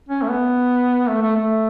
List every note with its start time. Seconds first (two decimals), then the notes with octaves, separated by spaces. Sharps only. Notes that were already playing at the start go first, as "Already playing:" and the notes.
0.09 C#4
0.22 A3
0.29 B3
1.09 A3
1.22 A3
1.35 A3